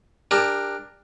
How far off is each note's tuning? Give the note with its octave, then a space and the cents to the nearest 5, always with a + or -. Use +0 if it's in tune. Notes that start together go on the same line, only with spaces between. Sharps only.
D4 +10 G4 +25 A#4 +0